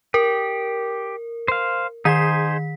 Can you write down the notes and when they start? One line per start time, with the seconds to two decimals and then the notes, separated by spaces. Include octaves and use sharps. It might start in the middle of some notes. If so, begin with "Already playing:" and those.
0.14 G4 A#4
1.48 C5 F5
2.05 D#3 D#4 G#4 C5 B6